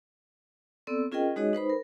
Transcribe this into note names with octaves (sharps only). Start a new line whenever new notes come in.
B3 C4 A4 D5 E6
C#4 F4 G#4 A#4 D#5 G5
G#3 D#4 F#4 G#4 C#5 D#5
D#4 B4 C5 B5
A#4